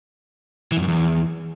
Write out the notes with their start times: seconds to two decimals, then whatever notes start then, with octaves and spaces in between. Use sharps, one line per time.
0.72 E3
0.77 F2
0.82 F#2
0.88 E2